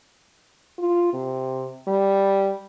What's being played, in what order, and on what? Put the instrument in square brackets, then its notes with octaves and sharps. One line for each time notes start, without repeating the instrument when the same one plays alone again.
[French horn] F4
C3
G3